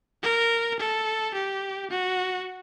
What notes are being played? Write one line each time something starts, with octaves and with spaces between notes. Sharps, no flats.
A#4
A4
G4
F#4